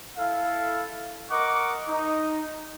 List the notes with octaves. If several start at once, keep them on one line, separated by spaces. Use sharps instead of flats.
E4 A4 F5
A#4 D#5 F#5 C#6 D6
D#4